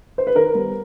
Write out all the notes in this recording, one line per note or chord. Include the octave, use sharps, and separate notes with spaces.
C5
B4
D#3 A#4
G3 B3